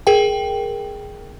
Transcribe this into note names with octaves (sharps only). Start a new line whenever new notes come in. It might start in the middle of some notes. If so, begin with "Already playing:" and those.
G#4 A#4 G5